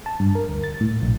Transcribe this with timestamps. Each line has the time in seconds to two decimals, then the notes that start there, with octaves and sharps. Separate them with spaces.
0.06 A5
0.20 G2
0.35 A#4
0.49 D2
0.64 A6
0.81 A2
1.02 A#1